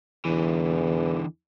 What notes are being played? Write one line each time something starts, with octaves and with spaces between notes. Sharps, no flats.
E2 D3 E3